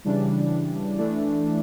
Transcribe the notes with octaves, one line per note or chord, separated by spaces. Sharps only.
C#3 E3 G3 D4
E3 A3 D4